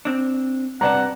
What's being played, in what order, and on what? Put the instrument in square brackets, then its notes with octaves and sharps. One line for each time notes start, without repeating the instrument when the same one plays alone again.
[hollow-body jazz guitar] C4 D4
[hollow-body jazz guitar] G2 C3 A5 [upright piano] B4 D5 A#5 [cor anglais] F#5